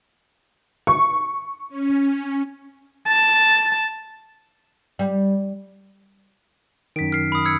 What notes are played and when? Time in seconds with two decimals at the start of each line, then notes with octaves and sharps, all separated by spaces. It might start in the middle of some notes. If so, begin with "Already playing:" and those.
0.87 C#6
1.69 C#4
3.08 A5
4.99 G3
6.96 F#2 D#3 B6 D7
7.12 F6 C7
7.32 B5 D#6
7.45 E6 G#6 C#7